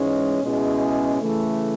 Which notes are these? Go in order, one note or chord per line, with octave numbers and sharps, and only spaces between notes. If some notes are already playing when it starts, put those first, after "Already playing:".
Already playing: G#2 E3 G#3 C#4
B2 G#3 C#4 E4 G#4
C#3 E3 A3